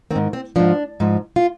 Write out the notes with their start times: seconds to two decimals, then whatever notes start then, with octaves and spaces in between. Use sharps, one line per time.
0.11 G#2 D#3 C4
0.33 C4
0.56 G#2 F3 D4
1.00 G#2 F3
1.36 F4